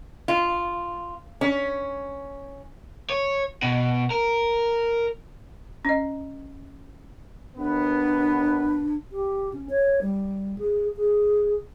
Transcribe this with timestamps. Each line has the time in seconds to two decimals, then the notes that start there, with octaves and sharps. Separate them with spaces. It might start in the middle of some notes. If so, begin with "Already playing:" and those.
0.28 F4
1.41 C#4
3.10 C#5
3.62 B2
4.11 A#4
5.85 C#4 D#5
7.57 D#2 B3 D4 B4
9.12 G4
9.53 C#4
9.69 C#5
10.02 G3
10.58 G#4
10.97 G#4